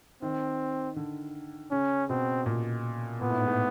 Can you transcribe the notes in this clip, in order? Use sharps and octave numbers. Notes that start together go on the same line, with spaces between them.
D#3 C4
D3
C#3 C#4
B2 C4
A#2
A#2 B3
A2
G#2
A2